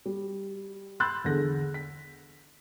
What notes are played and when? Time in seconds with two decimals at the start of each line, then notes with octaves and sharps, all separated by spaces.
0.06 G3
1.00 B5 C6 E6 F#6 G6 A6
1.24 E2 D3 G#4 A4 A#6
1.74 B6